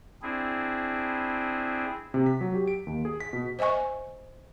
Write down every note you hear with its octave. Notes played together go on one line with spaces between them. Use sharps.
C4 D4 E4 G#4
C3
B6
F#3
G4
D7
D#2
G#4
B6
B2
C5 D#5 E5 G#5 C#6